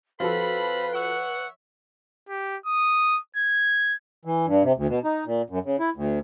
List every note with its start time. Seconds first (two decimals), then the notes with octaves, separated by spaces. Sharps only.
0.20 F3 C4 F4 F#4 A4 B4 B5
0.94 C#5 E5 F#5
2.29 G4
2.66 D#6
3.36 G#6
4.25 E3
4.47 G2
4.63 C3
4.77 D2
4.89 B2
5.04 D#4
5.26 A#2
5.50 F#2
5.65 C#3
5.80 E4
5.96 D2